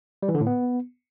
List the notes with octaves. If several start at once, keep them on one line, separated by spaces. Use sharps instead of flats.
G3
E3
D3
A2
B3